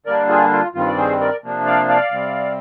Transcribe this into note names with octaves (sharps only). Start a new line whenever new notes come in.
D3 G3 A#3 D4 A#4 D5
F4 G#4
F4
G2 D#3 G3 C4 F4
D5
G#4 C5
A#4 D5
C3 F3 A#3 D4
D5 F5
D5 F5
C3 G3 C4